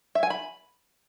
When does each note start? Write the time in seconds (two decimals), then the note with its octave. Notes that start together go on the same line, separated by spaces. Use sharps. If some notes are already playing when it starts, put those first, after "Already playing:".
0.15 E5
0.23 G#5
0.30 B5